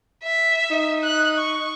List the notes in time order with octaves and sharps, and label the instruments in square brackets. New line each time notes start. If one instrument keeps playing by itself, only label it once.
[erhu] E5
[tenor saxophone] D#4
[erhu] F#6
C#6